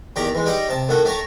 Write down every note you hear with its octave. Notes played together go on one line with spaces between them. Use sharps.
E2 D#3 G4 D5 A#5
E3 G#3
G3 D#4 D5 D#5 G5
C3 A5
A2 D#3 F#4 A4
A3 G4 C#5 A5 A#5